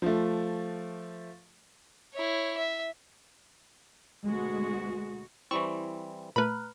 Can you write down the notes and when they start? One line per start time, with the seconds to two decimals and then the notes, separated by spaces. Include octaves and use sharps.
0.02 F3 A3
2.14 E4 C#5
2.58 E5
4.25 D2 B2 G#3 F#4
5.51 E3 G3 C4 E4 C#6
6.36 A#2 A3 B4 A#5 B5 F6 F#6